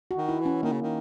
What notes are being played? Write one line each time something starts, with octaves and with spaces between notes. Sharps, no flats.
F#4
D#3
E4
E3
C#4
D#3 A#3
C#3
D#3